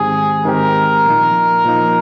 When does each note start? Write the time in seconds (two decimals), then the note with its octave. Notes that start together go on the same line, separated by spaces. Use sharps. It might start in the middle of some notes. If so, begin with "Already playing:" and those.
Already playing: G#2 D#3 G#3 C4 G4 G#4
0.45 G#2 D#3 G#3 C4 G4 A#4
1.06 A#2 F3 A#3 D#4
1.65 A#2 F3 A#3 D#4